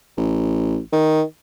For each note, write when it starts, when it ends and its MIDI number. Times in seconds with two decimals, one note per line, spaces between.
0.17 0.78 33
0.93 1.22 51